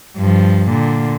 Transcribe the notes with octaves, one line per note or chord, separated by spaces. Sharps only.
G2 F3
A#2 D3